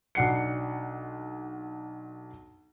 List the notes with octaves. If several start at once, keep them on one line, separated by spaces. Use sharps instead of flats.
B1 D4 F#5 C7 C#7